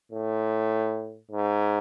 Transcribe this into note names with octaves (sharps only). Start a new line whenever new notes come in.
A2
G#2